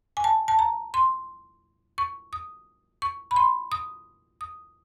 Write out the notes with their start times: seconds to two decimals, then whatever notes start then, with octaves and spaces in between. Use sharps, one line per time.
0.17 G#5
0.24 A5
0.48 A5
0.59 A#5
0.94 C6
1.98 C#6
2.33 D#6
3.02 C#6
3.31 B5
3.36 C6
3.72 D#6
4.41 D#6